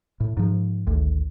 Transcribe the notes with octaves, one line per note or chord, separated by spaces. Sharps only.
A2
G#2 F3
G#1 D2